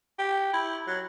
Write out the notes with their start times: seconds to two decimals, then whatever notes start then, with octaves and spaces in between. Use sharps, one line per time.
0.19 G4
0.53 E4
0.87 F#3